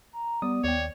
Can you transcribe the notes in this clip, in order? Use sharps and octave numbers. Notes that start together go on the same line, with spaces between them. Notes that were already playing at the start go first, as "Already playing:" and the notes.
A#5
G3 B3 D5 D#6
D#2 C#5 D5 G5